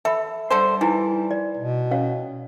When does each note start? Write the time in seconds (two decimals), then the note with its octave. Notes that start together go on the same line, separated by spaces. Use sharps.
0.05 A4 E5 B5
0.50 D3 G3 A4 C5
0.81 E3 D#4 E4
1.31 D5
1.57 B2
1.91 C#4 C#5 F5